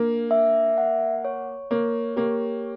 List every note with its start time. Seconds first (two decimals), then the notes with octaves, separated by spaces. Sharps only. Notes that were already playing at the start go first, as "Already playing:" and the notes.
Already playing: A#3 D4
0.31 E5
0.78 F#5
1.25 C#5
1.71 A#3 C#5
2.16 A#3 G4